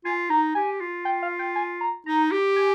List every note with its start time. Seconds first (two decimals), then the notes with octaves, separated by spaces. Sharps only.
0.05 F4 G#5
0.30 D#4 A#5
0.55 G4 G#5
0.81 F4
1.05 G5
1.23 F5
1.39 G5
1.56 G#5
1.81 A#5
2.06 D#4 A#5
2.32 G4
2.56 G#5